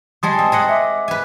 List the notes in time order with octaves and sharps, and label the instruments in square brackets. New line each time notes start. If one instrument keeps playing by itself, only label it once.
[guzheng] G3 G#3 G#4 [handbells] A5 C6 D#6
[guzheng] C4
G#4 D#5 F#5
[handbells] E5 D6
[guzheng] B4 G#5